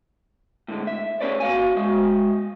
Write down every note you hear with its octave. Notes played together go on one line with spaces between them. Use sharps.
A2 D3 G#3
E5
A3 C#4 G#4 B4 C#5 D5
F#4 F5 G#5
G#3 F#4 E5